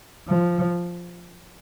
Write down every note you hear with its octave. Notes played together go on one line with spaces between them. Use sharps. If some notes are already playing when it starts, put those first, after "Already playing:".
F3